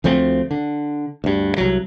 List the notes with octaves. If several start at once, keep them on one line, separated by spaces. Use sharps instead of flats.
D2 F3 A3 C4
D3
D2 G2
C2 F#3